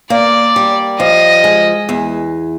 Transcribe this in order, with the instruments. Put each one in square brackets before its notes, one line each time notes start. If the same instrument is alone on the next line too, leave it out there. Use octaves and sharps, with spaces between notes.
[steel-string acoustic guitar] A#3 [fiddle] D5
[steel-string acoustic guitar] G3
[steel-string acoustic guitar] F3 [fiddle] D#5
[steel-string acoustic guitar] G#3
E2